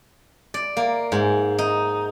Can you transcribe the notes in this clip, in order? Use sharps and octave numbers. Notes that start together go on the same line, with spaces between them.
D5
A#3
G#2
D#4